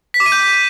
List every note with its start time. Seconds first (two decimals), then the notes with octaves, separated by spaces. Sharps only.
0.14 B6
0.20 D6
0.26 D#7
0.32 G6